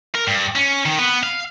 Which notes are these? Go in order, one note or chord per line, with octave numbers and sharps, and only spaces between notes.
A#4
G2
C#4
D#3
B3
F5